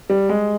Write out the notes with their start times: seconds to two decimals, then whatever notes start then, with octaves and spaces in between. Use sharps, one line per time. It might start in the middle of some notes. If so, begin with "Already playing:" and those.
0.10 G3
0.29 G#3